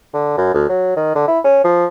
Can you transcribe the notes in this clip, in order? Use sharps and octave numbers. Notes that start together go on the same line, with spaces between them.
D3
F#2
D2
F#3
D#3
D3
E4
C#4
F3